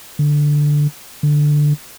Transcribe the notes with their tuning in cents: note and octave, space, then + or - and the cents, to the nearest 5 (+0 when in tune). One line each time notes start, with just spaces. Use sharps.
D3 +0
D3 +5